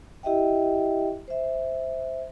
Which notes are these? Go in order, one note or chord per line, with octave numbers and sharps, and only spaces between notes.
E4 G4 D#5 E5 G5
C5 E5